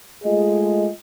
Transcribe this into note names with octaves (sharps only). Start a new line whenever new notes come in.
G#3 A3 F4 G#4 D#5